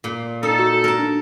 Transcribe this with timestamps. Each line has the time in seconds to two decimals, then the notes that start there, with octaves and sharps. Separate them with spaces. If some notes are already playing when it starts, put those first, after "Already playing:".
0.04 A#2
0.43 D#4 A4
0.59 F#4
0.84 A#4 A5
0.99 D4